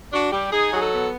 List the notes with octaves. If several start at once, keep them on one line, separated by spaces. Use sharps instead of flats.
D4 F#4
G3 G4
D#4 G#4
F#3 G#4
A4
B3